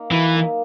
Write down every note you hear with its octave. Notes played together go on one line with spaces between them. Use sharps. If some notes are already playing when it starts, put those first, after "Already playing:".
Already playing: A#3 D#4
E3 F#3
A#3 D#4